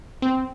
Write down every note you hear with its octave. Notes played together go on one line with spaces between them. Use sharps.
C4